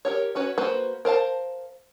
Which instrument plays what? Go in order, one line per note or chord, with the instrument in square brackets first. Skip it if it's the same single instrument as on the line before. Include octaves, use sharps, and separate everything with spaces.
[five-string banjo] G4 A#4 C#5
C#4 F#4 B4 C#5
A#3 F#4 B4 C5
A#4 C5 F5 A5